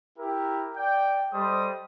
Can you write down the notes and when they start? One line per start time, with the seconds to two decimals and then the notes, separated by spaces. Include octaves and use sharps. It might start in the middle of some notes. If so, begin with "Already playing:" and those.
0.19 E4 G4 A#4
0.77 D5 G5
1.33 G3 A4 C5 D#5 D#6